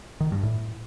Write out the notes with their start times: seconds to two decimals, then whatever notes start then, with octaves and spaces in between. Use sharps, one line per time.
0.20 D#3
0.32 G2
0.43 A2